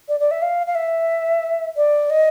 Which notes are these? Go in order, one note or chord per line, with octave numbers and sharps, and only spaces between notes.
D5
D5
E5
F5
F5
E5
D5
D#5